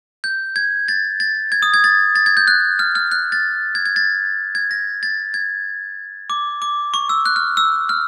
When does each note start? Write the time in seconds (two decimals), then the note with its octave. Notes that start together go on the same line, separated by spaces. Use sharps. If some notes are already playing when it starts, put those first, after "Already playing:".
0.24 G6
0.56 G#6
0.88 A6
1.20 A6
1.52 G#6
1.62 D#6
1.74 G#6
1.84 A6
2.15 A6
2.26 G#6
2.37 G6
2.47 F#6
2.79 F6
2.95 F6
3.11 F#6
3.32 A6
3.75 G#6
3.86 G#6
3.96 A6
4.55 G#6
4.71 A#6
5.03 A6
5.34 G#6
6.30 D6
6.62 D6
6.94 C#6
7.09 E6
7.26 F#6
7.36 F6
7.57 E6
7.89 F6